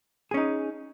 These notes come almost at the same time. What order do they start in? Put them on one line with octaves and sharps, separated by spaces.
G#4 C#4 D#4